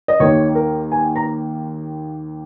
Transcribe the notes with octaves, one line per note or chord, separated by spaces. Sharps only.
D#5
D#2 D#3 A#3 C#5
A#4
G#5
A#5